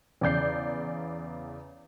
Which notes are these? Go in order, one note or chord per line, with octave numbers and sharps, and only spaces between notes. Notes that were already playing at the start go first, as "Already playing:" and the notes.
E2 C#3 D5 G6 C7